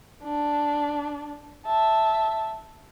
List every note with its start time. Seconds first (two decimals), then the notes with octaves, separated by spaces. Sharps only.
0.23 D4
1.66 E5 A5